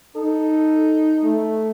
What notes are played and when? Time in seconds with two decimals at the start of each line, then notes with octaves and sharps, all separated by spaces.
0.16 D#4 A4
1.23 A3